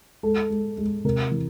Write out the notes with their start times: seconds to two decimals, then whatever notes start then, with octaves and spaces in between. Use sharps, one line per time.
0.23 G#3 A4
0.50 G#3
0.78 G#3
1.04 C3 A#4
1.31 E3